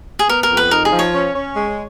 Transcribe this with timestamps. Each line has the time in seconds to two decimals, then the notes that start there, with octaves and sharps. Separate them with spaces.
0.19 G#4
0.29 B3 A#4
0.43 A#4
0.50 F2
0.57 B4
0.71 D#4 A#4
0.85 G#4
0.92 F3
0.99 C#5
1.13 C#4
1.35 C#4
1.56 G#3